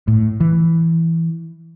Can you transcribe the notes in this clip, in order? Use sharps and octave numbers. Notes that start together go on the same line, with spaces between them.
A2
E3